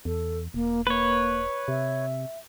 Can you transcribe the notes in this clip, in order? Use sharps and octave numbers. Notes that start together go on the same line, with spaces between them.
E2 A4
E1 A#3
A#3 B4 C#5
C3 E5